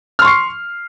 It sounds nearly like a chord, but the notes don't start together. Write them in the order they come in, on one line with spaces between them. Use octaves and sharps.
F6 C6 C#6 C7